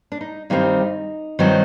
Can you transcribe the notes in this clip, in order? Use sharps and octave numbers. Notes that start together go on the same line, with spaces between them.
D4
D#4
G2 D#3 G3 C4 D#4
G2 D#3 F#3 C4